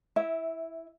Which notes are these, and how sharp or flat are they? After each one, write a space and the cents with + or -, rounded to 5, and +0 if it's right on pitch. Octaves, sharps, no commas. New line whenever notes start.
E4 +0 E5 -20